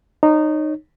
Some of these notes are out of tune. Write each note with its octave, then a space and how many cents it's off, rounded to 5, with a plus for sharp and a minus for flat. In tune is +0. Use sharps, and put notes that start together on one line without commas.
D#4 -20 C#5 +0